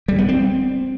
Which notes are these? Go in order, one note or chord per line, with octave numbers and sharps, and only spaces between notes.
G3
B3
C4